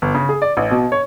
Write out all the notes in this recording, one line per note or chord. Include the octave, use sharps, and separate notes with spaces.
G1
C#3
G#4
D5
A1
B2
C#5